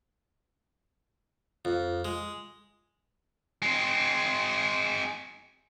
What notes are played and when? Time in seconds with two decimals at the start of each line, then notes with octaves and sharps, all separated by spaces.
1.65 F2
2.05 G#3
3.62 G#3 C4